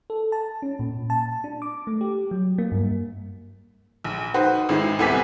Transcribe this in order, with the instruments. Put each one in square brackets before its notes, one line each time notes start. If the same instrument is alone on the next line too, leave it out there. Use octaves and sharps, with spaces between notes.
[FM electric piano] A4
A5
C#4
A#2
A5
D4
D6
A3
G4
F#3
A#3
G2
[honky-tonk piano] A#1
D#4 F#4 B4 C5
G#1 G#3 E4
C2 C3 B3 G#5 D6 B6